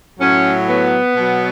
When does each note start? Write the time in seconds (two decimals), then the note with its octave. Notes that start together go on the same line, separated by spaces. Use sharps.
0.20 A2 F#3 C#4
0.68 B3
1.16 B2 F#3